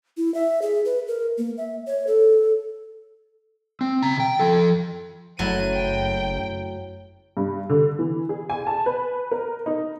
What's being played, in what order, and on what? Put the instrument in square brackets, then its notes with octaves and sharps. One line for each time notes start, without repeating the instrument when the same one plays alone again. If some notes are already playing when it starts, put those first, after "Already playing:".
[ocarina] E4
E5
G#4
B4
A#4
A#3
E5
C#5
A4
[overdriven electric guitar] C4
C#3 A#5
G5
F3 A4
[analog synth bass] F#1 [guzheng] F#3 A3 E4 [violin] D#7
[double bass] F#2 [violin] G5
[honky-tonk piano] G2
D3
E3
G#4
G#5
A5
B4
A#4
D#4